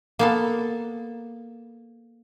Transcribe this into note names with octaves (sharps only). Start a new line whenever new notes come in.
A#3 B3 A4